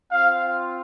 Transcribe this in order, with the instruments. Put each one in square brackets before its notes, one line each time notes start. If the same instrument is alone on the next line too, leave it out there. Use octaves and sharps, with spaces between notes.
[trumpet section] C4 F4 F5